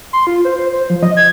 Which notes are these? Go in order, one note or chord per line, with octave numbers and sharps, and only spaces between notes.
C6
F4
C5
C5
C5
F3
D#5
G#6